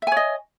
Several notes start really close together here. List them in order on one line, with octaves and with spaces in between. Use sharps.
E5 G#5 C#5 D#5